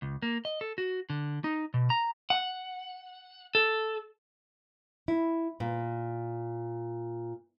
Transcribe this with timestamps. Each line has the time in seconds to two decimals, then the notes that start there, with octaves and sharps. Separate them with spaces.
0.02 C#2
0.22 A#3
0.45 D#5
0.61 A4
0.78 F#4
1.10 D3
1.44 D#4
1.74 B2
1.90 A#5
2.30 F#5
3.55 A4
5.08 E4
5.60 A#2